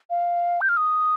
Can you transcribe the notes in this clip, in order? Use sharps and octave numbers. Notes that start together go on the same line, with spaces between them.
F5
G6
F6
D#6